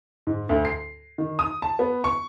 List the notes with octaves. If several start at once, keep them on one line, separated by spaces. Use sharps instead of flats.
G#2
D2
C7
D#3
D#6
A5
B3
C#6